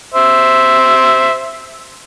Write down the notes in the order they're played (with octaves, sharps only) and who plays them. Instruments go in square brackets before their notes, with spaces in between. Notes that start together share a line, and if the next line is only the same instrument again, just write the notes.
[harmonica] C5 E5